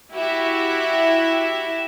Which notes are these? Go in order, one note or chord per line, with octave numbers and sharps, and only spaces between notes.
E4 F#4 G4 E5